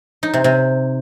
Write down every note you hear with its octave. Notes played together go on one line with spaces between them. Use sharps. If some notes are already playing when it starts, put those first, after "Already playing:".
D#4
C3
C3